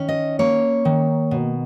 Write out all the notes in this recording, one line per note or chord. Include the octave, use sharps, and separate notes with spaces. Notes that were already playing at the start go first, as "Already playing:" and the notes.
Already playing: D#3 C#4
D#5
A#3 C#5
D#3
B2